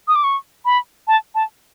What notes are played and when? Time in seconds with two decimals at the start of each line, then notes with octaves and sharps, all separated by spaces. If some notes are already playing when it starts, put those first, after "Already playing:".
0.08 D#6
0.16 D6
0.24 C#6
0.65 B5
1.08 A5
1.35 A5